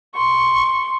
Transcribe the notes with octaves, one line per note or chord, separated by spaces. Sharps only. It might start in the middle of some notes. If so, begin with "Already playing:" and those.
C6 C#6